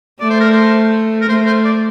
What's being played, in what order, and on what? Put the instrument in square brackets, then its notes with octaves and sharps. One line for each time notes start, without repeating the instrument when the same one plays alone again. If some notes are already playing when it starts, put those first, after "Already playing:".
[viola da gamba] A3 [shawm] D5
[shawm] C5
A#4
C5
A#4
[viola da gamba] A3 [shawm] C5
[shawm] C5
D5